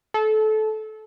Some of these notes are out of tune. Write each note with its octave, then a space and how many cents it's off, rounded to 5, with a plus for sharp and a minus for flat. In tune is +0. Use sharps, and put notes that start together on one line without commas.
A4 -25